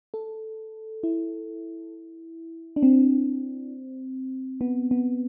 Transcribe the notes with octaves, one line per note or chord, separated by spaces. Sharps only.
A4
E4
D4
C4
B3
B3